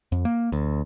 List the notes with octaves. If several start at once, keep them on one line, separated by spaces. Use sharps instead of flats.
F2
A#3
D2